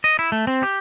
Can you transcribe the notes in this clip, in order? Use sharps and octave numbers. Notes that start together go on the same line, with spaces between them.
D#5
E4
A3
C4
G4